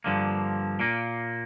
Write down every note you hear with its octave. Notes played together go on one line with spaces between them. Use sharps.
G2 D3 F3 A#3
A#2 A#3